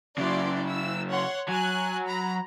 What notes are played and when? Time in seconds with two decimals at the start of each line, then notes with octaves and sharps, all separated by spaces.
0.18 C#3 F#3 E4 D5 C6
0.63 E4 E6
1.09 C#5 F#5 C6
1.49 F#3 G#5 F#6
2.06 A#5 B5